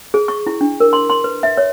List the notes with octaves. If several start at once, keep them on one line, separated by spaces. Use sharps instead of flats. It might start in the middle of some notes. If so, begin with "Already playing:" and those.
G#4
C#6
E4
D4
A#4
C6
C6
B4
E5
C#5